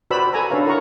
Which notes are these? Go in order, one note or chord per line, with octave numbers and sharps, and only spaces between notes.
F#4 B4 C5 D5 B5 E6
A4 G#5 A#5 E6
D4 A4 B4 C#5 F5 A#5
E4 A#4 C#5 F#5 A#5 C#6